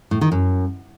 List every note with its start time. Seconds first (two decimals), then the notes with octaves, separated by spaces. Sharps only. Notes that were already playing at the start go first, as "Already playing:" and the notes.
0.11 A2
0.21 D#3
0.32 F#2